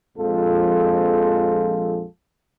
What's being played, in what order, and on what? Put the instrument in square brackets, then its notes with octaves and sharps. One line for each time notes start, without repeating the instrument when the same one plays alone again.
[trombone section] A#1 F2 F3 G#3 F4 A4